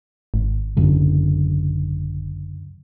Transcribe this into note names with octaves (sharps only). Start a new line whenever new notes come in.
G#1
C#2 F#2 D3